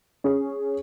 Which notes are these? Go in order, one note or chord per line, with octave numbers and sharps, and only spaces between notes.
C#4 G#4